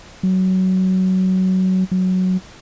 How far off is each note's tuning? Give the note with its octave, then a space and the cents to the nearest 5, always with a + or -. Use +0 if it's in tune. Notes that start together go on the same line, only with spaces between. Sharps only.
F#3 +15
F#3 +0